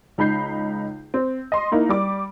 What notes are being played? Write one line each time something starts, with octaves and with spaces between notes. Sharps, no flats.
C#2 D#4 B5 G6 C7
C4
D#5 C6
A#3 D#4 E4
G3 D6